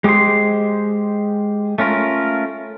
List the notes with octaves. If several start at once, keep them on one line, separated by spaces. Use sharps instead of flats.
G#3 G4 G#4 C5 C6
A3 C#4 F4 A#4